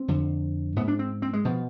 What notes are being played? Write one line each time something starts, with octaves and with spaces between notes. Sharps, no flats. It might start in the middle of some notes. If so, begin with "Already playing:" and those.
Already playing: C4
F2 D3
G#2 B3
D4
C4
C4
G#3
B2 F3